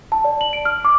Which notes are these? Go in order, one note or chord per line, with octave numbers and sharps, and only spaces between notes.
A5
D5
F#7
D7
F6
D6